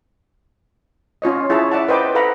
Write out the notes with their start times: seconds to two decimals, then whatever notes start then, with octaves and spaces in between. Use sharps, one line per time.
1.22 C#4 F4 C#5 D#5
1.50 E4 G#4 C#5 E5 A5
1.72 D5 E5 F#5 A5
1.88 B4 C5 D#5 G5 B5 D6
2.15 A4 B4 F5 F#5 A#5 B5